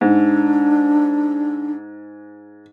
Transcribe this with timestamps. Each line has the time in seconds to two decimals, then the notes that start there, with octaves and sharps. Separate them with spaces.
0.01 G#2 D4